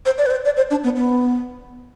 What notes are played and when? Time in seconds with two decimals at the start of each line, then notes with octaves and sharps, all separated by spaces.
0.06 C5
0.18 D5
0.26 B4
0.31 C5
0.45 D5
0.57 C5
0.71 D4
0.84 B3
0.96 B3